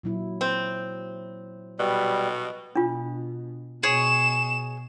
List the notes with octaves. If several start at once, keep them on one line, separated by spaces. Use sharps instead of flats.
A#2 F#3 E4
C4
B2 G3
B2 D4 F4
B2 G#4 C#5 E7